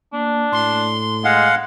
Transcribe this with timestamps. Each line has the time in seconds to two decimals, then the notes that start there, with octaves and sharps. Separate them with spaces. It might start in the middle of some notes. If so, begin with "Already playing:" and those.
0.13 A#3 D4
0.53 A2 C6
1.25 G#3 F5 F#5